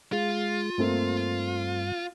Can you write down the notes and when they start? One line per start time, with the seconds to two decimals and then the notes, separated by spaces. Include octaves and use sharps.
0.12 G#3 F4
0.78 G2 A3 A#3 C4